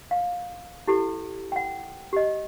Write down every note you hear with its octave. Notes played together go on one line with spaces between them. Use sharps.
F5
E4 G4 A4
F#5 G5
G4 D#5